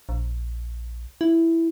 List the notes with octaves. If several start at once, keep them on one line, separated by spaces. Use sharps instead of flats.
A#1
E4